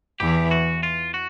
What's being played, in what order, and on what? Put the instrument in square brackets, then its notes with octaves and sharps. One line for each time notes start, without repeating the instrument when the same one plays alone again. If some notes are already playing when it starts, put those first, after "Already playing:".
[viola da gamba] E2 E3 [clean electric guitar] G4
[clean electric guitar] F#4
F4
F#4